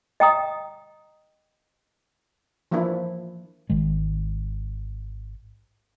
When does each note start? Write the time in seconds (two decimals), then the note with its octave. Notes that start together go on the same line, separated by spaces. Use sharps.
0.20 D#5 G5 A#5 D#6
2.71 E3 F3 A#3 D4 E4
3.70 G#1 D#3 G#3